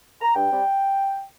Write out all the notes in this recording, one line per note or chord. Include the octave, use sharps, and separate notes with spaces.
A#5
G2 G5
G3 C4